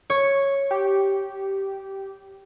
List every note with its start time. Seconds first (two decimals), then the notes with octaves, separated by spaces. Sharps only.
0.10 C#5
0.71 G4